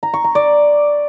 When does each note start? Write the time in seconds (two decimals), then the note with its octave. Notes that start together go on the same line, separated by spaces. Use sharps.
0.03 A#5
0.14 C#6
0.24 A#5
0.35 D5